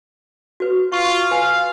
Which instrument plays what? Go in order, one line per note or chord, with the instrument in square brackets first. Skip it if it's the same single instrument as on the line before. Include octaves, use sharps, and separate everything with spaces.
[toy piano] F#4 B4
[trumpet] F4 [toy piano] C#6
[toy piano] B4 G#5 [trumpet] F5